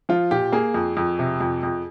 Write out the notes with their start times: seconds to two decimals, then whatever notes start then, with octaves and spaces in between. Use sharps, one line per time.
0.09 F3 F4
0.31 A#2 G4
0.52 A#3 G#4
0.74 F2
0.97 F2
1.19 C3
1.41 F2
1.63 F2